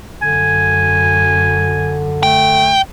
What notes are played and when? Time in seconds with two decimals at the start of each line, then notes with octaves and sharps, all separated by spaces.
0.22 F#2 D3 G#5
2.23 A3 G5